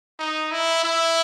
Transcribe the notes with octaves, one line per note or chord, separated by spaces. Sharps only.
D#4
E4
E4